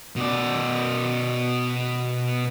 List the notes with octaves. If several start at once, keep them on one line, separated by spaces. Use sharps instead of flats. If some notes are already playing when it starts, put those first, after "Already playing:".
B2 D5